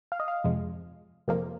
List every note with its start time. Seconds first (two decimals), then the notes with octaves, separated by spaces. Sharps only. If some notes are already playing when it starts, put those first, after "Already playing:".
0.12 F5
0.20 D#5
0.28 F5
0.44 F2 C3 F3 G#3
1.28 F2 C3 F3 A#3